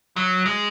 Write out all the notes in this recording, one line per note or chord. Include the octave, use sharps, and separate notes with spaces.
F#3
G#3